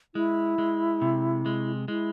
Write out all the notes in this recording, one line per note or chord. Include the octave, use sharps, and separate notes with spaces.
G#3 E4
G#3
C3
G#3
G#3 E4